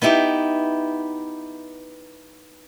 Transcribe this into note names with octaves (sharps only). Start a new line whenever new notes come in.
B3 D#4 E4 G4